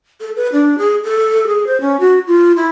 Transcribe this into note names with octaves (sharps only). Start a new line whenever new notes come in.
A4
B4
D4
G#4
A4
G#4
C5
C#4
F#4
F4
E4